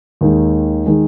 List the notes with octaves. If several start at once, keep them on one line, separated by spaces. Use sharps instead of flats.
D#2 D#3 G#3
D#3 G#3